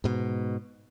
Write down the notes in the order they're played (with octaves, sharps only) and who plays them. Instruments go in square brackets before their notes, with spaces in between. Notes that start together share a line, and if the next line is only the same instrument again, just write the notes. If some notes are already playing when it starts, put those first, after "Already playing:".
[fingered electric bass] G#2 B2